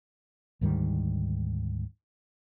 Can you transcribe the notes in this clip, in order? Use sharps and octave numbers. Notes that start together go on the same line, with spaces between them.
D2 G#2 D#3 G3